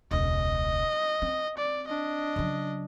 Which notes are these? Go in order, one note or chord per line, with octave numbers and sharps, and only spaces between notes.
E1 C#2 D#5
C4
D5
D4 D#5
C#3 F#3